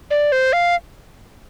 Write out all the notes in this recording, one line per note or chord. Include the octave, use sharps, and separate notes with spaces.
D5
C5
F5